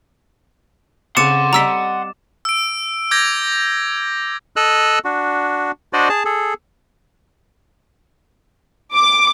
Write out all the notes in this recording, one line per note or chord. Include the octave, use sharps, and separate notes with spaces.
C#3 C4 F#5 C6 D6 A6 C#7 E7
G3 D5 D#5 A#5 E6 B6
E6 D7
D6 G6 G#6 A#6
A4 D#5 E6 F#6
D4 F#4
D4 F#4 C5 D5 D#5
G#4 A5
G#4 A4
D6